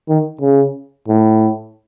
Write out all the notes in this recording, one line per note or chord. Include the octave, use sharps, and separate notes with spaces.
D#3
C#3
A2